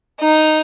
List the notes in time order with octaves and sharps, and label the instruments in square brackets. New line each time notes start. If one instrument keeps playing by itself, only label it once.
[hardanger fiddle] D#4